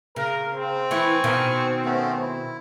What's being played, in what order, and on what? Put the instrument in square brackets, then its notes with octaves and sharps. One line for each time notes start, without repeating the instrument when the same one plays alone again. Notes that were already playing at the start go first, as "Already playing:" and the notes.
[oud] C#3 [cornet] A#4
[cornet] C4
[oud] E3 E4 [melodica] G#5 C#6
[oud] B2 D#3
[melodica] A3 B3 C#4
E4